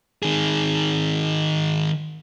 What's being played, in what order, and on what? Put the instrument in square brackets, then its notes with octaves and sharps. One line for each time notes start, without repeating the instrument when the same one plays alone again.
[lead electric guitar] D#3 G#4